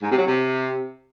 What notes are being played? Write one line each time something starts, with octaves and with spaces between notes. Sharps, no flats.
G#2
C3
F#3
C3